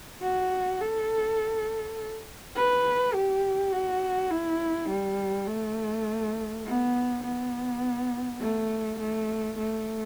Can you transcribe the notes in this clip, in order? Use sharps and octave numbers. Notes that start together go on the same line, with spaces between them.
F#4
A4
B4
G4
F#4
E4
G3
A3
B3
B3
A3
A3
A3